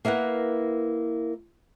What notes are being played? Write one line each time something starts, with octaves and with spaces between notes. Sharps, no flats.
A#3 E4 A#4 B4 F#5